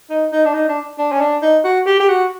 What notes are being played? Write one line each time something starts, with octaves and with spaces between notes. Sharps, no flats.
D#4
D#4
D4
D#4
D4
D4
C#4
D4
D#4
F#4
G4
G4
F#4